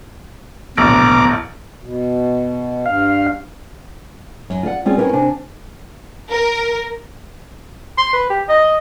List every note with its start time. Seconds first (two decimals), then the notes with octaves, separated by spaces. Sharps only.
0.78 D1 A#1 B2 A#5 D6
1.82 B2
2.86 G2 F5
4.50 F#2
4.63 F4 D5 F5 F#5
4.85 G3 C4 C#4 F4 G#4
4.97 C4 C#4 E4 G4 A#4 B4
5.13 C3 D4 G#5
6.31 A#4
7.98 C6
8.13 B4
8.30 G4
8.49 D#5